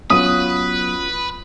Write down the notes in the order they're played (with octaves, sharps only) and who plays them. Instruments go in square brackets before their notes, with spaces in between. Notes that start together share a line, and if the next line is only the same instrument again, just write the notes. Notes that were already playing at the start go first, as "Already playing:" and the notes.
[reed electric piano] F#3 B3 [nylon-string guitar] C#4 F4 F#4 [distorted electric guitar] B4 [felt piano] D#6